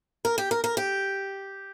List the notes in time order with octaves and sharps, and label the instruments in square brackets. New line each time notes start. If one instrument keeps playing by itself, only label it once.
[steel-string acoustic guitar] A#4
G4
A#4
A#4
G4